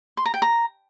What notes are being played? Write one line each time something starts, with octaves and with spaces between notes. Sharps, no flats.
C6
A#5
G5
A#5